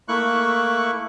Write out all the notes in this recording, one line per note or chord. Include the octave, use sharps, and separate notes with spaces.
A3 A#3 E4 C#6 F#6